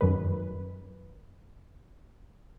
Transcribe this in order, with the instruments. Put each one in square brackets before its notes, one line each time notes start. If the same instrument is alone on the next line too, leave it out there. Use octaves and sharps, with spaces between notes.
[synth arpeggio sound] F#2 D#3 B4